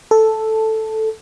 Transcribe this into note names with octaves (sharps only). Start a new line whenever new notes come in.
A4